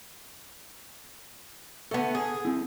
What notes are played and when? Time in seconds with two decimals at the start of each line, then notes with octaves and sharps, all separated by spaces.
1.91 A3 B3 A4 F#5
2.15 G#4
2.45 C4 E4